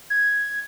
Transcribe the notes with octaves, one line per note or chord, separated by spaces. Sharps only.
G#6